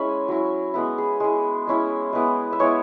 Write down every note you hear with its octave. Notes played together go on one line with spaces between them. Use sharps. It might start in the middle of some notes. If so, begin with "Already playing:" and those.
Already playing: G#3 C#4 E4 G#5 B5
F#3 E4
G#3 B3 E4
G#4
G#3 E4
G#3 C#4 E4
G#3 B3 E4
E5
G#3 B3 E4 C#5